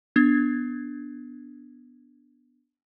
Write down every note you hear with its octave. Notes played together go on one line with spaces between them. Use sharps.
B3 D4 G#6